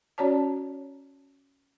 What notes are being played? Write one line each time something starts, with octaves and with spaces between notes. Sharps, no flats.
C#4 F#4 C#5 D5 A5